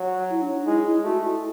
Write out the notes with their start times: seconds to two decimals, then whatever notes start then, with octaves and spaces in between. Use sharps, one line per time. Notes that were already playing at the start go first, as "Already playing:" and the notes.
Already playing: F#3
0.30 E4
0.42 D4
0.54 D#4
0.66 G#3 E4
0.86 E4
1.04 A3 F#4
1.24 E4